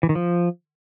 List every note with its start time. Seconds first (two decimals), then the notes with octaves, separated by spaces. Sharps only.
0.03 E3
0.09 D#3
0.15 F3